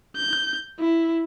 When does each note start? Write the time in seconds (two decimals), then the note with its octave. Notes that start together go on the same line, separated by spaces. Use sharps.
0.17 G6
0.80 E4